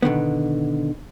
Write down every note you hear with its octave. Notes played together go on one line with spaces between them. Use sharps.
B2 D3 D#3 B3